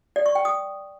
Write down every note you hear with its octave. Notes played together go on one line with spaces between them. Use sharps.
D5
C#6
G5
D#6